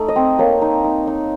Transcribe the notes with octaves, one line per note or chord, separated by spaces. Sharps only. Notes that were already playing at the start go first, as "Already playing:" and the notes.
Already playing: A3 D#4
D#5
C4
A#3 C#5
D#4
D#4
D#4